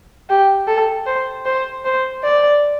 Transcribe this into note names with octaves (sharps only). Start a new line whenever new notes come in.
G4
A4
C5
C5
C5
D5